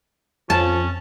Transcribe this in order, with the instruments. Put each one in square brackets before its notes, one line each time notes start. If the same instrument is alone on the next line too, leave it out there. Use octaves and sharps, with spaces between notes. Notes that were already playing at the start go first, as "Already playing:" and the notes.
[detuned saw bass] F2 [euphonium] F3 [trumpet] C#4 [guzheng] A5